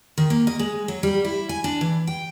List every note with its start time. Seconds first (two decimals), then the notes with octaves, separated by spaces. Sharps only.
0.18 D#3
0.30 A#3
0.47 D#5
0.59 G#3
0.88 F#3
1.03 G3
1.25 E4
1.49 G#5
1.64 D4
1.81 E3
2.07 G5